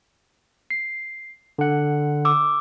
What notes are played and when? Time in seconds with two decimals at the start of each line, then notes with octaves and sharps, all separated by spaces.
0.70 C7
1.59 D3 F#5
2.25 D6 E6